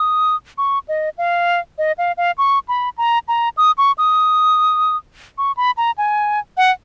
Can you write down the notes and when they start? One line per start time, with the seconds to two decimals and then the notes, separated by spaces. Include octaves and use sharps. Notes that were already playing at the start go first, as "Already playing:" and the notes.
Already playing: D#6
0.58 C#6
0.88 D#5
1.18 F5
1.78 D#5
1.98 F5
2.18 F5
2.38 C#6
2.68 B5
2.98 A#5
3.28 A#5
3.57 D#6
3.78 C#6
3.98 D#6
5.38 C#6
5.57 B5
5.77 A#5
5.98 G#5
6.57 F#5